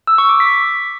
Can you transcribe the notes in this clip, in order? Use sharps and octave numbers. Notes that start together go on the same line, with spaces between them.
E6
C#6
D6
B6